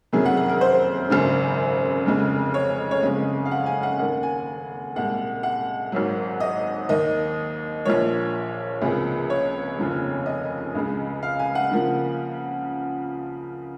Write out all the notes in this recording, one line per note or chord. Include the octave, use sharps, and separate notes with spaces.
F#1 F2 C3 D#3 F#3 G#4
F#5
F#5
A#4
C5
G#1 F#2 C#3
F1 F2 C#3 G#3
C#5
C#5
F#1 F2 C#3 G#3 D#5
F5
F#5
G#5
F#5
D#2 D#3 A#3 F#5
G#5
C2 A#2 G#3 F#5
F#5
G#1 G#2 D#3 F#3
D#5
D#2 D#3 A#3 D#5
A#1 A#2 F3 A#3 C#5
C#2 C3 F3 A#3 G#4
C#5
F1 D#2 C#3 F3
D#5
C#2 C#3 G#3
F5
G#5
F#5
C#3 F3 A#3